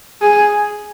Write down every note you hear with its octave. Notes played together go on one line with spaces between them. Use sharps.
G#4